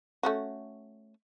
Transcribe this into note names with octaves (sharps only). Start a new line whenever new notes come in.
A3 C#4 F#4